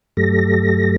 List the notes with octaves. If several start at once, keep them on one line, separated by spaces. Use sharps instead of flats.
G2 F#3 A3 G4 A4 A#6